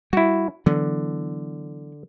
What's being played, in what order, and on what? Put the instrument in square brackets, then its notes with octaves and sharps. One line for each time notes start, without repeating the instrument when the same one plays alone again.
[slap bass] G3 [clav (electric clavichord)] E4 F#4
[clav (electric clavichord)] D3 [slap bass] E3 F#3 B3